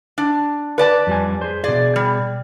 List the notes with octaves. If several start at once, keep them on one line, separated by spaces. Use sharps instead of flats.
D4
B4 D5 A5
F2 G3 G#5
G#4 C5
B2 G#4 D5
G3